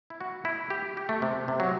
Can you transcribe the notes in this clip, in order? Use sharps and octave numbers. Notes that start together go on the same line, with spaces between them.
E4
F#4
E4
G4
G4
A3
C3
C3
F#3